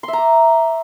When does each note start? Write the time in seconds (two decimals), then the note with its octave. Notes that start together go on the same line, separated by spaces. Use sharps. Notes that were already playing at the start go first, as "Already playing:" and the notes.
0.03 C6
0.08 E5
0.13 A#5
0.18 D6